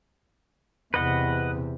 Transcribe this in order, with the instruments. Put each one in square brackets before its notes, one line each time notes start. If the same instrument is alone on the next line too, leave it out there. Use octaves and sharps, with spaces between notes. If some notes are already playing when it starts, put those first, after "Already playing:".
[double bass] E2 C3 [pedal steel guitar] B4 D#5 F#5